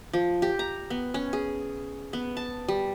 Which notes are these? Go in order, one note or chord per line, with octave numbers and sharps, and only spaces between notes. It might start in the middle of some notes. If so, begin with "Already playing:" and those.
F3
G4
A#5
B3
C#4
G#4
B3
A5
G3